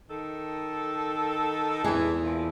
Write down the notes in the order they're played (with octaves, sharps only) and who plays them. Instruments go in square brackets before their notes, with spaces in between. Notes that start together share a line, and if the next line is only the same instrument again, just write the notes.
[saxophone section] D#3 A4
[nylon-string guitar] E2 G#4 [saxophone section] E3
[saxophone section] A#2 F3 E4